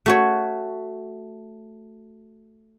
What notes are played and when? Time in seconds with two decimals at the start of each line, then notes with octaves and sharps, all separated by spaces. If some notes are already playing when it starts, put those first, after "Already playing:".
0.06 A3 F#4 C#5